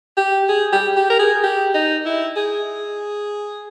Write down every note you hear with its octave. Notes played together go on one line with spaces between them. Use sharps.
G4
G#4
G4
G4
A#4
G#4
G4
D#4
E4
G#4